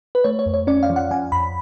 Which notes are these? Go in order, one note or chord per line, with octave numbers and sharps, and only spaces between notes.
B4
A3 C#5
C#5
F2
C#5
C#4 D5
F5
F3
F#5
F3 G#5
F2 B5